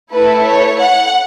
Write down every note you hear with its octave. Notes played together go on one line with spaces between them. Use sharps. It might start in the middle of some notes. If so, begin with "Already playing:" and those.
A3 E4 A4 B4
C#5
F#5